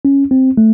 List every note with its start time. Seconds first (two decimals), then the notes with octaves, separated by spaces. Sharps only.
0.05 C#4
0.31 C4
0.58 A3